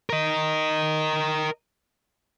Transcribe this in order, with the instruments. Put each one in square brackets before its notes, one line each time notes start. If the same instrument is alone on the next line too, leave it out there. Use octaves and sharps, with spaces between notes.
[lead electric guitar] A#4 D#5